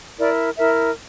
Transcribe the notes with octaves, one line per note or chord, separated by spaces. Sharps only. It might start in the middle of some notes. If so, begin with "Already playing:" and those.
E4 A#4 D5
E4 A#4 E5